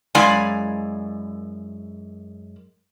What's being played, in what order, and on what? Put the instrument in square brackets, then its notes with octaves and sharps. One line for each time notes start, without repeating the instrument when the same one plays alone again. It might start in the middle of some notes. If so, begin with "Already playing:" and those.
[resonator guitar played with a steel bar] F#2 G#3 E4 D5 F5 G#5